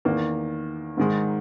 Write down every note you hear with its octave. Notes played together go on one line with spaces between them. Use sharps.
E2 D#3 A#3
G#2 D#3 G#3